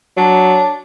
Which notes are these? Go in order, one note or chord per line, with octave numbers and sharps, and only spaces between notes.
F#3 D4